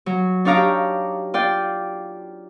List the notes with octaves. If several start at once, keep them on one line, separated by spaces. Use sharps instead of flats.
F#3
D4 D#4 C#5 F5 A#5 D6
G4
F4 D5 G5